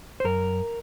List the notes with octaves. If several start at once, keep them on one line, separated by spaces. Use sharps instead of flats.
C5
F#2 A#4